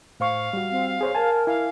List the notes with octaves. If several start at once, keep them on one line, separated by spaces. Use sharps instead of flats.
A2 C5 F5 C#6
G3 F#4
C4
G#4 C5 C#5
A#4 G#5 A5
E4 F5 G#5